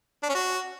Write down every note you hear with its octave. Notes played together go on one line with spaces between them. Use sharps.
D4
C#4
F#4